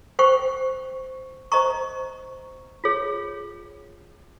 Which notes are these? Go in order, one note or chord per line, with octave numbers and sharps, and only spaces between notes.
C5 G5 C#6
C5 D#5 A#5 C#6
F4 G#4 C#5